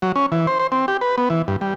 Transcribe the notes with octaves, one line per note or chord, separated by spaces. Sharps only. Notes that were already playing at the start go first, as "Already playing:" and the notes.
F#3
C#4
E3
C5
C5
C4
G4
B4
B3
E3
G2
G3